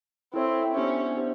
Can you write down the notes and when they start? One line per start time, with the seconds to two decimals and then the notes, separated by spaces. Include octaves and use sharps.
0.34 C4 E4 A4 C#5 E5
0.74 B3 C#4 D4 G4 C5 E5
1.15 B3 D4 G4 C5 E5